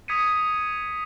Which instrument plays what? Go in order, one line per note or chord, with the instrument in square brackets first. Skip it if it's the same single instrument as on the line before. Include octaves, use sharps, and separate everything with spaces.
[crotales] D#6 G#6 B6 C#7 D#7